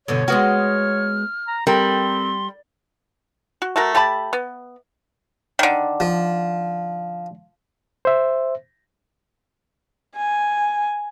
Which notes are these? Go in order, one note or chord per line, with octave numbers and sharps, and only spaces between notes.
G2 B2 D3 C#5
G#3 B3 F#4 F6
A#5
G3 C4 A#4 C6
F#4
A3 F#4 A#4
A3 G4 A5 B5
B3
D3 D#3
F3
C5 E5
G#5